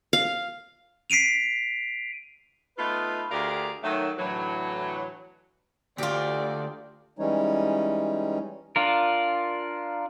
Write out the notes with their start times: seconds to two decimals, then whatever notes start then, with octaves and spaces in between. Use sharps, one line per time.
0.13 F5
1.10 B6 C7 D7 D#7 F7
2.78 A3 B3 D#4 F4 B4
3.31 D2 G4 G#4 A#4 D5 F5
3.83 D#3 F#3 A3
4.18 A2 D3 E3 F#3
5.98 D2 F4 G4 D5
7.19 E3 G3 G#3 C#4 D#4 C#5
8.76 D4 F4 A#4